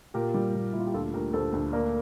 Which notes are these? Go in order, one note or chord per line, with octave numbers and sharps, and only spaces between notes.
A#2 G4 A#4
G3
A#2
A#2 E4
F4
G4
D2 F4 A4
D2 G4 A#4
D2 A4 C5
D2
A#3 A#4 D5